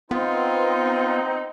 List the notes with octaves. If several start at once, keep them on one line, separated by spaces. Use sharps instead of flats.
B3 C4 D#4 F4